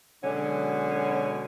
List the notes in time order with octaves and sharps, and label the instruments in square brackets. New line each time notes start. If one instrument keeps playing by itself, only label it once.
[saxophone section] B2 D3 F#3 G#3 C#4